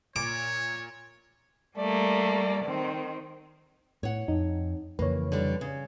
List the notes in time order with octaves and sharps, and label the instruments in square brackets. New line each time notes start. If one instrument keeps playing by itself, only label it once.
[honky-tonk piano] A#2 [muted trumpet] C#5 [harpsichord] D6
[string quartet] G3 A3 A#3 [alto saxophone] D5
[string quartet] D#3 C4
[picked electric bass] A2 [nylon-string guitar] C#5 F#5
[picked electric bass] F2 [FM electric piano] D#4
[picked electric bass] F2 C#3 E3 [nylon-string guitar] A#3 [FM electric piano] B4 C#5
[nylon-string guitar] D3 G3
C#3